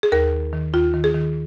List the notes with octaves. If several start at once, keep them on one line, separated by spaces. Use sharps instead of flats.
G#4
D#2 A#4
D#3
D#3
D#2 F4
D#3
G#4
D#3